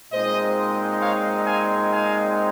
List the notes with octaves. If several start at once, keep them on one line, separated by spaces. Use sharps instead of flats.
A#2 G#3 C4 D#4 C5 D#5
C#5 F5
F5 G#5
F5 G#5